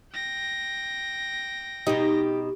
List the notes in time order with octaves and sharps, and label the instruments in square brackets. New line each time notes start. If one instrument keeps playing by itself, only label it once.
[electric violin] G5 A#6
[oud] B2 D#4 [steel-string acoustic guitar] G4